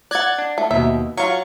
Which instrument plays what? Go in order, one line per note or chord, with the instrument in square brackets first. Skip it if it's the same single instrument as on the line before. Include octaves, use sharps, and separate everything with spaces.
[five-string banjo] D5 F#5 [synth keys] F#6 G#6 A6
[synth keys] D4
[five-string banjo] A3
[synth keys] D#2 B2 [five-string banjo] E5
[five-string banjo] F#3 F4 [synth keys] C#6